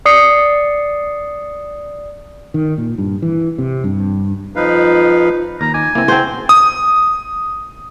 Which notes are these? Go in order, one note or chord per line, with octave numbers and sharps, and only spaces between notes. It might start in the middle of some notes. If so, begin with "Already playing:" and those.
D5 D#6 C7 C#7
D#3
A#2
G2
E3
C3
G2
F2 F3 D#4 B4 F5
D#2 A#5
D#4 G#5 D6
C#3 A#3 C4 E4
C4 F#4 C5 A5
D#6